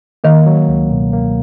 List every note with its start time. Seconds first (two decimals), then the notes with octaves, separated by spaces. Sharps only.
0.24 D#3 A#3
0.46 F#3
0.68 C#2
0.90 B2
1.13 A#3